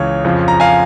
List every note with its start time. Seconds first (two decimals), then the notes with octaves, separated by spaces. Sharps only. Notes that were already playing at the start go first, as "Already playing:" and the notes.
Already playing: C#2 C#3 E3 C#5
0.24 F2 C#3 F3
0.48 A#5
0.60 F5 G#5